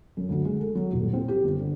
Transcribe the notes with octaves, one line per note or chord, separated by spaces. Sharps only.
F#2
D2
G#3
A4
F#3
D#1
C4
G4
G1
D3